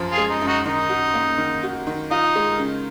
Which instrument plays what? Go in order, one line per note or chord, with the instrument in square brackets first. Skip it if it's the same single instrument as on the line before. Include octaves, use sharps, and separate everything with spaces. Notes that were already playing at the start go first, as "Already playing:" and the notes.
Already playing: [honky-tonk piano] F#2 F3
[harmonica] F4 G#4
[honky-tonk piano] G#3
[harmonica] D#4
[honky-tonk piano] F#2
[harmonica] D#4 F#4
[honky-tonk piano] D#3 [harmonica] D#4
[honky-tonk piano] F#4
A#3
D#3
F#4
D#3
[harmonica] D#4 [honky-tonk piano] F4
[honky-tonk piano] G#3
C#3